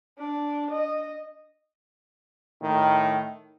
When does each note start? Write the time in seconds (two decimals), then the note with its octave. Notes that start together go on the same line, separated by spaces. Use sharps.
0.19 D4
0.71 D#5
2.62 A2 D#3